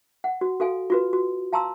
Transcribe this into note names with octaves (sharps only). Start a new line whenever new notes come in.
F#5
F#4
F#4 A4 F5 G#5
F4 F#4 B4
F#4
F5 A5 A#5 C6 E6